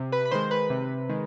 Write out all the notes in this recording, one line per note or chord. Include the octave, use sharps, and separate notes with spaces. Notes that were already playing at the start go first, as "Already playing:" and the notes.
Already playing: C3
B4 B5
B5
D#3 G#3 C5 C6
B4 B5
C3
D#3 G#3